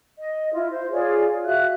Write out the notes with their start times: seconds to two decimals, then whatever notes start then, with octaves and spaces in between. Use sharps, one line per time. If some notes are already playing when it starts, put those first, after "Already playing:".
0.18 D#5
0.53 E4 F4
0.71 C5
0.92 F4 G#4 C#5 D5
1.46 F#4 E5 F5 F#6